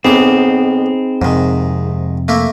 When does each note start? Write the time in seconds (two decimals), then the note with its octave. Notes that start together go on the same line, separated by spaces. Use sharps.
0.05 B1 B2 C4 D#4 G#4 B5 D6
1.22 F2 G#2 C3 D#3
2.28 A3 A#3 E4